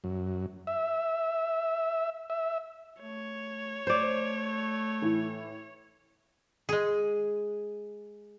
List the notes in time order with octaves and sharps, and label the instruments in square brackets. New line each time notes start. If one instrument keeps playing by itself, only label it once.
[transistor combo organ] F#2
E5
E5
[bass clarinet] A3 [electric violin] C#5
[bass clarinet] A3 [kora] C5 D5
[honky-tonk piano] A2 E3
[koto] G#3 G#4